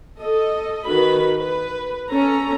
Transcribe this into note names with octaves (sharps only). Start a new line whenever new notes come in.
A4 D#5
D#3 F#4 B4 B5
B4
C#4 A4 A#5